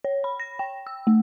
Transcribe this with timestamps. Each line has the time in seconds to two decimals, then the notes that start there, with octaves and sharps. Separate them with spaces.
0.05 C#5
0.24 B5
0.40 A#6
0.59 G5
0.87 E6
1.07 A3